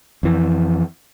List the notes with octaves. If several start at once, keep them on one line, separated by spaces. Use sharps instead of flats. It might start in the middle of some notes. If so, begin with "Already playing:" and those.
F2 E3